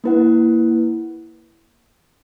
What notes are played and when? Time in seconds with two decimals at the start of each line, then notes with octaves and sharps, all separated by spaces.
0.04 A#3 E4 B4 F#5